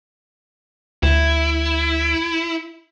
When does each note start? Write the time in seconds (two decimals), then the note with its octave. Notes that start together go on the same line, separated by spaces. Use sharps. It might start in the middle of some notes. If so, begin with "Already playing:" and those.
1.03 D2 E4